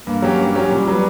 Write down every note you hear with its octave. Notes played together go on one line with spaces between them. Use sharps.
G2 A#3
F#3 C#4 G4
G2
F#3 C#4 G4
A#2 G3
F#3 B3